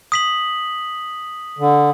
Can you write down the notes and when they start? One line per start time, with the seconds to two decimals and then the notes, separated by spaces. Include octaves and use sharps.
0.12 D#6 B6 F#7
1.59 D3